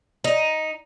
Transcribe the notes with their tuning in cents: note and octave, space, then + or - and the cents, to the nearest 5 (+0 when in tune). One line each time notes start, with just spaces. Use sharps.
D#4 +5